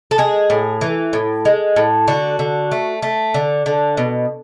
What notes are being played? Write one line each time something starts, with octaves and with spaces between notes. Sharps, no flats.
A4
G#3 G#4
A2
E3
A2
G#3
A2
D3 F#4
D3
A3
A3
D3
D3
B2